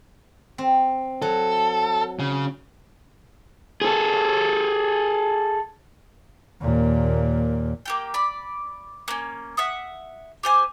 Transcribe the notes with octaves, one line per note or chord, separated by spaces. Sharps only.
C4
F#3 A4
C#3
G#4 A4
D#2 A#2
A#3 G4 G5
D5 B5
A#3 C#4
E5 F#5 D#6
G4 C5 G#5